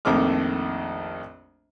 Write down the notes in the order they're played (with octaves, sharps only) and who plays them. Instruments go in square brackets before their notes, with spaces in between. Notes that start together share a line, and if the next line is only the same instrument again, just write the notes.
[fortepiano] A#1 F2 D#3 A3 D6 F6